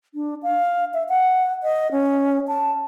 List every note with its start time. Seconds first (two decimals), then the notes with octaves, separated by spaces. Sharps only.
0.14 D4
0.43 F5
0.94 E5
1.09 F#5
1.63 D#5
1.92 C#4
2.48 A5